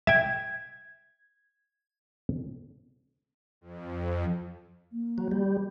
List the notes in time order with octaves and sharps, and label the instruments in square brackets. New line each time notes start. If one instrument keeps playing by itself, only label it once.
[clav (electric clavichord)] E5 G5 [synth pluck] G#6
[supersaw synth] F2
[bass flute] A#3
[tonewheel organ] F#3
G3